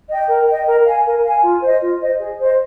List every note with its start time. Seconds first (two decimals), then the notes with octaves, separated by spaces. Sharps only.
0.09 D#5 G5
0.28 A#4
0.47 D#5 G5
0.67 A#4
0.86 F5 G#5
1.05 A#4
1.24 F5 G#5
1.43 F4
1.62 C5 D#5
1.81 F4
2.01 C5 D#5
2.20 G#4
2.39 C5 D#5